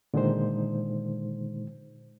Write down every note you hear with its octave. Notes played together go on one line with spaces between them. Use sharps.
A#2 D3 D#3 G#3 D#4 C5